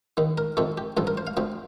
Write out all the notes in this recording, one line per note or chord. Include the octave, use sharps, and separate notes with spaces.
D#2 D#3
A#4
F2 C3 D#3 A4
G4
A1 G2 F3 A4
A#4
C5
F5
D2 C3 F3 G5